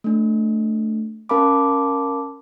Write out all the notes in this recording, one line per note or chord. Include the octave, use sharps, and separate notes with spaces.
A3 D4
C#4 A#4 F5 A5 B5 D6